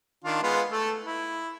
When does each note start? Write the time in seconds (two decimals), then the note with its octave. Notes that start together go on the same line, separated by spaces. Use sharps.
0.24 D#3 D4 F4
0.43 G#3 B3 F4
0.72 A3 A4
1.04 E4